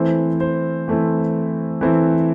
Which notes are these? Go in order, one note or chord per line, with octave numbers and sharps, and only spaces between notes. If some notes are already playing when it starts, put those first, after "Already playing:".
Already playing: E3 A3 C4 E4 C5
C5
E3 A3 C4 E4
E3 A3 C4 E4